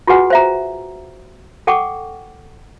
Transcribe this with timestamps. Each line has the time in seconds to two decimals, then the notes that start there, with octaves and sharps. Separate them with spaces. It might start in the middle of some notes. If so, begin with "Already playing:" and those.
0.07 F4 F#4 G#4 B4 F#5 G#5
0.30 C5 E5 A#5
1.67 A4 F#5 G5 C#6 D6